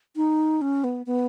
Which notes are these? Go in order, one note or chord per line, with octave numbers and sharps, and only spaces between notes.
D#4
C#4
B3
B3